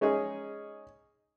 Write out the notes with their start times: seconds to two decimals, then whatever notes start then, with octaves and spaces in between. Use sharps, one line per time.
0.01 G#3 C#4 D#4 G#4